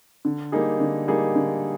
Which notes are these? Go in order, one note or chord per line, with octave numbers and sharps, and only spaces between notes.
D3
G3 A#3 D#4 G#4
D3
G3 A#3 D#4 G#4
D3